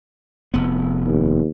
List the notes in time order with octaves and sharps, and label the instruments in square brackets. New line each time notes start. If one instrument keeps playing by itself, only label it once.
[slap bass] F1 B3
[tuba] D#2